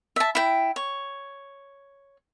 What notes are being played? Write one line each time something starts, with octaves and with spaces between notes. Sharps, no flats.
E5 A5
E4 G5
C#5